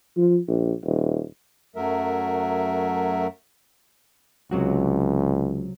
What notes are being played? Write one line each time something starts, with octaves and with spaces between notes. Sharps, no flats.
F3
A#1
D#1
F#2 F#3 A3 A#4 E5
C#2 C3 F#3 F#4